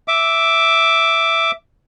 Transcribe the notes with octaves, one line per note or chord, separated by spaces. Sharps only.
E5 D6